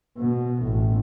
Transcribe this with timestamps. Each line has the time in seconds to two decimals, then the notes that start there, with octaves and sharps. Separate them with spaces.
0.17 B2
0.63 A1